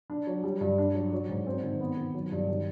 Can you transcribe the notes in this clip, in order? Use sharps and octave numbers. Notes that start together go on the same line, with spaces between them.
D4
F#3
G3
G2
D4
F#3
F#3
G#2
C4
D#3
B3
D#3
F#3
G2
D#3